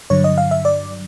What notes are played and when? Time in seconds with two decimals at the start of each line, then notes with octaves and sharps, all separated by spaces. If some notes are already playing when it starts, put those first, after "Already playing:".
0.10 G2 D3 F#3 C#5
0.24 D#5
0.38 F5
0.51 E5
0.65 D5